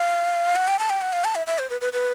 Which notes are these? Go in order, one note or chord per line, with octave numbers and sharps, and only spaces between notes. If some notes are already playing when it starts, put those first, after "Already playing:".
Already playing: F5
F#5
G5
A5
G5
F#5
F5
A5
E5
E5
C5
B4
B4
B4